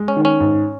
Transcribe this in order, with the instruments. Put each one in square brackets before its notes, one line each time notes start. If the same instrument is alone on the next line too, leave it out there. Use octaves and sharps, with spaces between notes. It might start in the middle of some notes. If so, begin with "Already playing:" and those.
Already playing: [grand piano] G#3
[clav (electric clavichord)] C#4
[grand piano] D#3
[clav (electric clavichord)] C#4
[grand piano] G#2